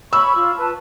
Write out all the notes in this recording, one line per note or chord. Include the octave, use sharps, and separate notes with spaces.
C#5 B5 C#6 E6
F4
B4 A5